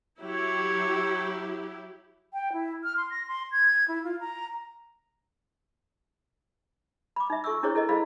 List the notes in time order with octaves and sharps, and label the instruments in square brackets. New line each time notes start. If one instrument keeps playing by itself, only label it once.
[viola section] F#3 E4 G4 [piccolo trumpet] C#5
[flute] G5
E4
F6
C6
A#6
C6
G#6
E4
F4
A#5
[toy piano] B5 D6
D#4 E5
F4 A4 C#6 D#6 E6
D4 E4 G#4 C5 C#5
E4 A4 A#4 D#5
E4 G#4 A4 C5 F5 B5